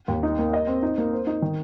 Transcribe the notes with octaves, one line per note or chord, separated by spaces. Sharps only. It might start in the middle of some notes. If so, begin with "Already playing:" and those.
D#2
D#4
A#3
D#5
C4
D#4
A#3
C5
D#4
D#3